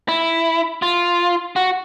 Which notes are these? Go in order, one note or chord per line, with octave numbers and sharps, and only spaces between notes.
E4
F4
F#4